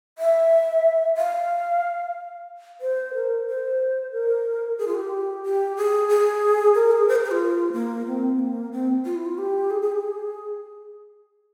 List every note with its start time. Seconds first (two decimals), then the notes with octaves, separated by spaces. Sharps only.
0.18 E5
1.17 F5
2.81 C5
3.14 A#4
3.48 C5
4.12 A#4
4.78 G#4
4.87 F4
4.95 G4
5.44 G4
5.77 G#4
6.09 G#4
6.75 A#4
6.91 G#4
7.08 C5
7.16 A#4
7.24 G#4
7.32 F4
7.73 A#3
8.07 C4
8.39 A#3
8.73 C4
9.05 F4
9.15 E4
9.26 F4
9.38 G4
9.71 G#4
9.82 G#4
9.92 G4
10.03 G#4